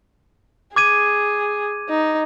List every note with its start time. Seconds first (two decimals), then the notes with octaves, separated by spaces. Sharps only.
0.76 G#4 D6 G#6 D#7
1.89 D#4